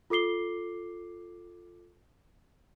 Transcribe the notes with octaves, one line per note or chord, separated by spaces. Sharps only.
F4 A4 D6 C7 G7